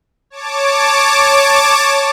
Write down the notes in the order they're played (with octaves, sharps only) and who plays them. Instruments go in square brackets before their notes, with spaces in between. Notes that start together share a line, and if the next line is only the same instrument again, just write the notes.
[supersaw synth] C#5 A5 D6